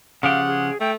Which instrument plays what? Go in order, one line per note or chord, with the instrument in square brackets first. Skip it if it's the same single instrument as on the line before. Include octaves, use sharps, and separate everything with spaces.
[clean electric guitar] C#3 F3 G4 [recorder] F5 [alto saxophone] F#5
[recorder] G#4
[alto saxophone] A3 [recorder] G5